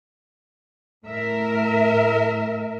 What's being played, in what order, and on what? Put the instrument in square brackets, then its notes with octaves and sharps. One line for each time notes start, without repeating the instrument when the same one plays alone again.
[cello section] A2 A#4 E5